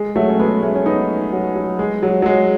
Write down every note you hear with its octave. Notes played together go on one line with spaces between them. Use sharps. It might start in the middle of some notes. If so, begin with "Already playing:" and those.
Already playing: G#3
F#3 A3
C#4
G#3 B3
A3 C#4
C#4
B3 D#4
F#3
F#3
G#3
F#3
F#3
G#3